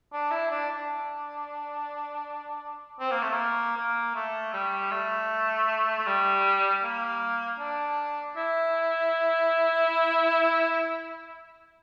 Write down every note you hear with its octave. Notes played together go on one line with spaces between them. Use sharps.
D4
E4
D4
D4
C4
A#3
A3
A#3
A#3
A3
G3
A3
A3
G3
A#3
D4
E4